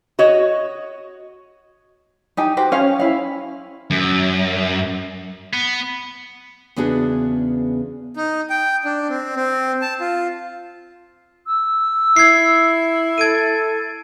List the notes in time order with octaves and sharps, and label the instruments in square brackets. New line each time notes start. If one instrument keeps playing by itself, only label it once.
[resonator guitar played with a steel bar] F#4 C#5 D#5
[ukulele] D#4 G4 G#5
F#4 G4 C5
[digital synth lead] C#4 [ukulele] C5 F5
[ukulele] E4 F5
[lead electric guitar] F#2
[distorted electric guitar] B3
[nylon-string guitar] E2 C#3 B3 D4 F#4 G#4
[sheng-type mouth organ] D#4
G5
D4
C4
C4
A5
F4
[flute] E6
[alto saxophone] E4 [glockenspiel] G#6 C7
[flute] A4 [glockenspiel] G#6 D7 D#7